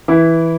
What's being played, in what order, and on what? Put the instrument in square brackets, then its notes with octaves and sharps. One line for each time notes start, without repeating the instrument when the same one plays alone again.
[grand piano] E3 E4